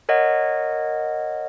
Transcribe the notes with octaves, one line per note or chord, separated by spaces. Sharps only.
A#4 C#5 D#5 F#5